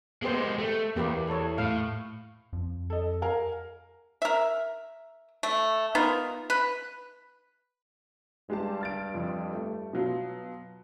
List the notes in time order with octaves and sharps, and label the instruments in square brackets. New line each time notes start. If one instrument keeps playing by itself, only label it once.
[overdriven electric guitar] G#3 G4 [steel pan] A#3 B3 C5
[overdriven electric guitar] A3
[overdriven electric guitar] E2 [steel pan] A#3 G4 B4
[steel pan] A4 C#5
[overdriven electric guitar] A2 [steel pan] F5
[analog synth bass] F2
[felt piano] A4 D#5
A#4 F5 G#5
[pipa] A#4 E5
A3
B3 D#4 F4 A#4
B4
[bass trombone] G2 [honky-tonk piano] G#3 G4 A5
[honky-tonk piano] F6 A6 D7
F2
A3
B2 F#3 F4